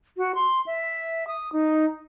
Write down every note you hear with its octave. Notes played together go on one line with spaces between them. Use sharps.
F#4
C6
E5
D#6
D#4